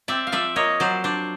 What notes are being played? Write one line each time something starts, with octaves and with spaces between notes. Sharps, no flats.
C4 D5 E5
F5
F3 D5 E5
A#3 C#5 D#5
F#3 C5 D5
D4 C5 D5